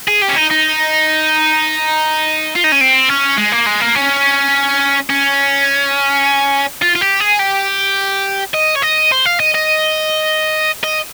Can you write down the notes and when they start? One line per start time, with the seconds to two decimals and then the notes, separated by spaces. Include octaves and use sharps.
0.08 G#4
0.22 G4
0.29 C#4
0.37 D#4
0.51 D#4
2.55 F4
2.64 D#4
2.72 C#4
2.81 C4
3.09 C#4
3.38 G#3
3.52 A#3
3.66 G#3
3.81 A#3
3.95 C#4
5.10 C#4
6.82 F4
6.95 F4
7.01 G4
7.20 G#4
7.39 G4
8.54 D#5
8.76 C#5
8.83 D#5
9.12 C5
9.25 F5
9.40 D#5
9.54 D#5
10.83 D#5